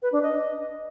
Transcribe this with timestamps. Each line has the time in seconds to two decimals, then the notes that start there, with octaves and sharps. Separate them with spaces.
0.02 B4
0.12 D4
0.22 D#5